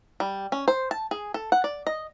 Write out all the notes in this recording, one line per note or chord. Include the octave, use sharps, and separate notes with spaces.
G3
C#4
C5
A5
G#4
A4
F#5
D5
D#5